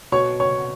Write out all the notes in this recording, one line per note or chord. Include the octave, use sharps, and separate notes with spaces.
B2 C#5 C#6
C#5 C#6